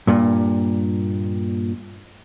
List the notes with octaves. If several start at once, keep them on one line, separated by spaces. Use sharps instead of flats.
G2 A#2